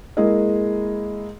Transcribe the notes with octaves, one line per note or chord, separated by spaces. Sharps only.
G#3 A#3 E4 G#4 A#4 D#5